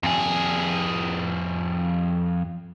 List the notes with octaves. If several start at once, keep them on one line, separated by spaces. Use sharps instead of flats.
F2 G#4